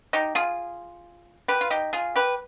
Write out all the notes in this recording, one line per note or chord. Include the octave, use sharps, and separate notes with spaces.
D#4 G4
F4 G#4
G4 B4
F4
D#4 G4
F4 G#4
G4 B4